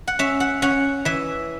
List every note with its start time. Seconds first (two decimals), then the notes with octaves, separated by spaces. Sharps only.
0.07 F#5
0.19 C#4 E5
0.40 F#5
0.62 C#4 F#5
1.05 E3 E5